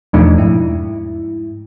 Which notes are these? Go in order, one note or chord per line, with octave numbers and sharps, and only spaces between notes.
E2 B2 F3 A3 D4 D#4
G#2 E4